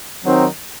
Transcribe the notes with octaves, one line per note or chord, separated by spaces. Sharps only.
D#3 F#3 C4 D#4